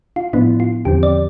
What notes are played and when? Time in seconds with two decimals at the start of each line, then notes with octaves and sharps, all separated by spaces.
0.16 F4
0.33 A2 F3 B3 D4 E4
0.60 F4
0.85 E2 D3 F3 C4 G4
1.03 D5